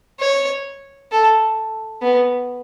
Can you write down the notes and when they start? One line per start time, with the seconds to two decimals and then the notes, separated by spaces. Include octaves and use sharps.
0.20 C#5
1.11 A4
2.02 B3